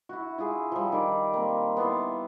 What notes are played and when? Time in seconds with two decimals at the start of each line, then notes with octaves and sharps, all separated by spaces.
0.09 E4 F#4
0.38 E4 F4 G#4
0.72 F3 G3
0.92 D#3 D5
1.34 A#3 C4
1.77 B3 E4 A5 C6